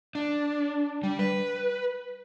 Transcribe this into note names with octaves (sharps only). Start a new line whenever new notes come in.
D4
G3
B4